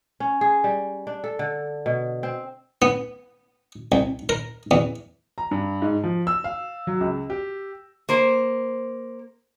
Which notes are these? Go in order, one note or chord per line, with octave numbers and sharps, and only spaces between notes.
C#4
G#4
G3
D4
A4
D3
B2
C4
B3
C2
A#4
E2
A#5
G2
G#2
F3
E6
F5
F#3
C#2
G4
A#3 C5